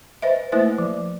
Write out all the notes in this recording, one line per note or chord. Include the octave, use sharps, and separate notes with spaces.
B4 C5 D#5 E5
A3 A#3 E4 B4 C5 E5
F3